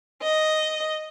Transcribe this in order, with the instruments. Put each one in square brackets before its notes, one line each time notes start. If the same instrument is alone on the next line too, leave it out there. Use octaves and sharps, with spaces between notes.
[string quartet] D#5